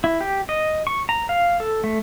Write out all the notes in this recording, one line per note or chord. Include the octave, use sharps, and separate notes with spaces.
E4
G4
D#5
C#6
A#5
F5
A4
A3